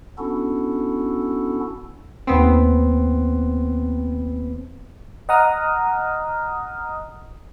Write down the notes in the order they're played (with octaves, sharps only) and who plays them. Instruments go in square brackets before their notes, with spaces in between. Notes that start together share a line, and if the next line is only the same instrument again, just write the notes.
[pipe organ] B3 C#4 D4 E4 F#4 A4
[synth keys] D#2 B3 C4
[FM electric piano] D#5 F#5 A#5 D#6 F6